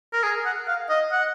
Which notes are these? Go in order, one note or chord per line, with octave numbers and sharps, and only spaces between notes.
A#4
G#4
F#5
F5
D#5
F#5